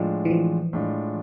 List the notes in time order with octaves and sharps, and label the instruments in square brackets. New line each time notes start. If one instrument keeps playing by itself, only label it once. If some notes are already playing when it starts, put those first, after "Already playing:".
Already playing: [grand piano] A2 G#3 D4 F4 [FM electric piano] F3
[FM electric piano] E3
F3
[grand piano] A2 G#3 D4 F4